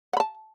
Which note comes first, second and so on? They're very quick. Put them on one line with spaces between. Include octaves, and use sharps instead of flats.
F#5 B5 A5